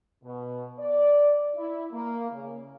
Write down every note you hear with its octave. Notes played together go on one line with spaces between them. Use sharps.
B2
D5
E4
A#3
C#3